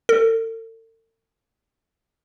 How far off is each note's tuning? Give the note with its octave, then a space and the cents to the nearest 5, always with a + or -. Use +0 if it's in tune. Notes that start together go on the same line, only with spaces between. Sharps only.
A4 +40